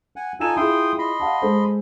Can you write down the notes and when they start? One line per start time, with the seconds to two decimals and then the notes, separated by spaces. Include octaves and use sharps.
0.16 F#5 G#5
0.40 D#4 F4 A4 G#5 E7
0.57 E4 F4 G#4 G5 C6 D#6
0.98 D#5 B5 C6
1.20 F5 F#5 A5
1.42 G#3 A4 C5